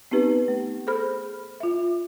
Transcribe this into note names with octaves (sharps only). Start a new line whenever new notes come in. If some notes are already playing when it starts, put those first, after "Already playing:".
B3 C4 D#4 G4 B4
A3
G#4 A4 C5 B5 F6
F4 E5